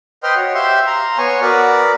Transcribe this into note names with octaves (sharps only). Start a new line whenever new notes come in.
B4 C5 D#5 G5 C6 F6
F#4 C#5
G4 C5 E5 F5 C6
F5 A#5 C6
B3 C#5 G#5 C#6
B3 F#4 A#4 B4 D5